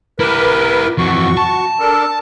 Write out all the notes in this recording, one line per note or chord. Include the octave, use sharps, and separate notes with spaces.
E4 G4 A#4 B4
F2 E3 F#4 C#6
A5
D4 A4 A#4